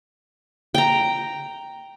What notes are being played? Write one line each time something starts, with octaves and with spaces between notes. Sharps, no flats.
G5 A#5